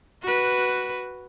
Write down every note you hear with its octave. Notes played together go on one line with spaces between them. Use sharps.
F#4 B4